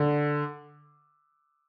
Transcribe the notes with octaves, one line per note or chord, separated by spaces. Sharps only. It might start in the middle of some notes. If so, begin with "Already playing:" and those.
Already playing: D3